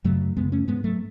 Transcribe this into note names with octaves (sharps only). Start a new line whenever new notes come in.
F#2 C#3 F#3 A3
F#2 C#3 G#3 B3
A3 C#4
G#2 G#3 B3
F#3 A3